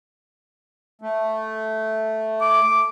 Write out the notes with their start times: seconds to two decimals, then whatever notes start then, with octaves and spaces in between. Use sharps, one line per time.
1.02 A3
2.41 D6